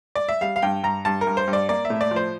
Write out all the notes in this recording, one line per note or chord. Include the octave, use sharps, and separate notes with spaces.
D5
E5
G3 F5
F5
G2 G5
G2 A#5
G2 A5
A#4
G2
C5
G2
D5
A#3 D5
E5
A2
D5
F3
C5